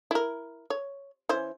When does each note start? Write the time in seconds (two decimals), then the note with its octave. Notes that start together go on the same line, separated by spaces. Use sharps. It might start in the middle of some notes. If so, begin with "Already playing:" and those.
0.11 E4 A#4
0.70 C#5
1.29 E3 C#4 C5